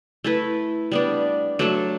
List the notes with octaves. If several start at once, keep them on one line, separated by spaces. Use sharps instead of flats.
A3 E4 B4
G3 B3 D4
F#3 A3 D4 A4